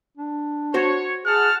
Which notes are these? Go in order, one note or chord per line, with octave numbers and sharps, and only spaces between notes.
D4
F#4 C5 C#5
G#4 F#5 A5 F6